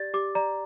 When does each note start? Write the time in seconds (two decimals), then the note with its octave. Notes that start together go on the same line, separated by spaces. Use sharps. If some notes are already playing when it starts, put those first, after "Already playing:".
Already playing: G4 D5 A6
0.14 G4 D6
0.35 D5 A#5